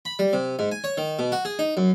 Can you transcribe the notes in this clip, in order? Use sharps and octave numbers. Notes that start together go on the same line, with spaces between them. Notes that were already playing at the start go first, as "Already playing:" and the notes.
B5
G3
C3
G#2
G#5
C#5
D#3
B2
F#4
G#4
D#4
F#2